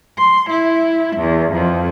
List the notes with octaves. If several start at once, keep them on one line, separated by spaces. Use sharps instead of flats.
C6
E4
E2
F2